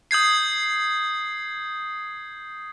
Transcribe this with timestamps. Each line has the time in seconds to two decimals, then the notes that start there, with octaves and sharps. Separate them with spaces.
0.11 D#6 G6 G#6 C7